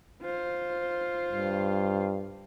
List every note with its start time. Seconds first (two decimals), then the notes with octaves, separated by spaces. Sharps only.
0.22 F4 C5
1.31 G2